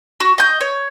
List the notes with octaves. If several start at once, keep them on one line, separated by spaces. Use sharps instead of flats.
F#4
D#5 G6
C#5